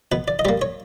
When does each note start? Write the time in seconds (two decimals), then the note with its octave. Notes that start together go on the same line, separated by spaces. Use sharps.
0.12 B2 B4
0.28 D5
0.39 D#5
0.45 G3 A#3 D5
0.62 C#5